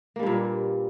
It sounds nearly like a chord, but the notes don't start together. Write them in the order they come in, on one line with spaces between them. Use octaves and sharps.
A#3 G3 G2 A#2